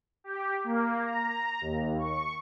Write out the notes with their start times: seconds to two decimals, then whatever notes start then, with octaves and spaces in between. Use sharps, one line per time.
0.24 G4
0.64 A#3
1.03 A#5
1.61 D#2
1.99 C#6